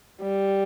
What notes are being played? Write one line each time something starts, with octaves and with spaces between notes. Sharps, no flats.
G3